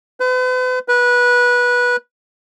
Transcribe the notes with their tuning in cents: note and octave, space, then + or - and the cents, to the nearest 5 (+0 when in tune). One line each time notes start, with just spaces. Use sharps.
B4 +40
B4 -20